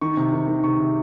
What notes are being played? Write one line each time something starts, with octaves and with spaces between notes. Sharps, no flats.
D#3 C#6
C3
D#3
D#3
C3 C#6
C3